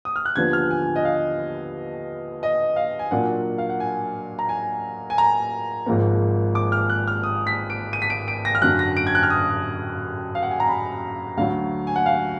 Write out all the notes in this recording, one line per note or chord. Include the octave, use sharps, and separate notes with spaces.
D#6
F6
F#6
D#2 D3 F3 B3 F4 G#6
F6
G#5
D#5
F5
D#5
F5
G#5
A#2 F#3 A#3 D4 F4 F#5
F5
F#5
G#5
A#5
G#5
G#5
A#5
G#1 G#2 F3 A#3
D6
F6
F#6
F6
D#6
B6
D7
D#7
B6
D7
D7
A#6
F6
F#2 D3 F#3 F#6
A#6
D7
G#6
F#6
F6
D#6
F5
F#5
G#5
A#5
B5
D2 D3 F#3 F5
G#5
F#5
F5